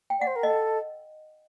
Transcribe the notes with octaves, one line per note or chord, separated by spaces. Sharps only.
G5
D5 F#5
C5
A#4
A4 D#5